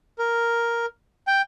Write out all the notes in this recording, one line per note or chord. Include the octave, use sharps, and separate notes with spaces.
A#4
G5